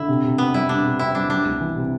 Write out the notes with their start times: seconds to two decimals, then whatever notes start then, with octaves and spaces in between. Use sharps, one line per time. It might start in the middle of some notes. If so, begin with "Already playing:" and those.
Already playing: D3 E4
0.08 C3
0.24 C3
0.38 B3 C4
0.54 G3 E4
0.69 C3 D4
0.84 C3
0.99 C4 E4
1.15 G3 D4
1.29 G3 D4
1.45 C2
1.61 E3
1.76 C3